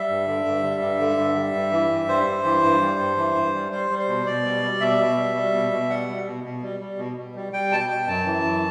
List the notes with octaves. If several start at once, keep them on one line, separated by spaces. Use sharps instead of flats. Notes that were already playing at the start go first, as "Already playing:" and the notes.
Already playing: G3 E5
G2
D3
G2
G3
G2
D3
G2
G3
G2
E3
G2
G3 C5
G2
E3
G2
G3
G2
E3
G2
G3
G3 C5
G3
C5
B2
B2 D5
G3
G3
B2 E5
B2
G3
G3
B2
B2
G3 F#5
G3
B2
B2
G3
G3
B2
B2
G3
G3 G5
B2 A5
G5
B2
F#2 A5
E3
F#2